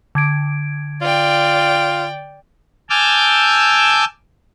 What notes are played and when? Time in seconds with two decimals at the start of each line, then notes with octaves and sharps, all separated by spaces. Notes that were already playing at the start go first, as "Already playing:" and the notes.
0.15 D3 G#6 D7
1.02 F4 D5 G5
2.90 G#5 A5 D6 E6 F6 G6